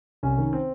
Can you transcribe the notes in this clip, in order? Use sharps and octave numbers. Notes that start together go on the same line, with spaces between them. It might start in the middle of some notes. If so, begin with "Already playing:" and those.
C2 C#4
D#3
C4